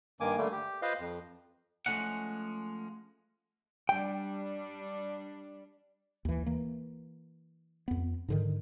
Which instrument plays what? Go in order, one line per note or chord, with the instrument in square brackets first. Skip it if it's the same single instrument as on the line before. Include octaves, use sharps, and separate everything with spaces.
[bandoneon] G2 D#3 A#3 G#5 D6
D3 G3 A3 A#3
G4
F4 B4 C5 D#5 F5
F2
[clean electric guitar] F3 G#3 A3 C#4 D#4 F#5
[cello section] G3 D4 [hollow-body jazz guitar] G5
[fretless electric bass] D#2 E3
E3 A#3
F2 B3
G#2 D3 D#3